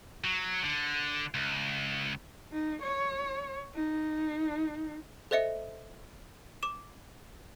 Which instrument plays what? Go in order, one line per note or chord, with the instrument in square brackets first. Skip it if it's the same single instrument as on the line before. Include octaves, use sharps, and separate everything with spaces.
[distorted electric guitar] F#3
D3
C#2
[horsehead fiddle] D#4
C#5
D#4
[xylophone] A4 C5 D#5 E5 C#7
D6 E7